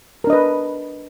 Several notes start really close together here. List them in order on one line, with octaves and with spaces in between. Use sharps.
A#4 D4 D#5 B4